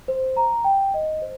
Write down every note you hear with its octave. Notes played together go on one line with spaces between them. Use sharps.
C5
A#5
G5
D#5
C5